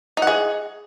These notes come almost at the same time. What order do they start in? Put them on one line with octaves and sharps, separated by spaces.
D#4 F#5 G#4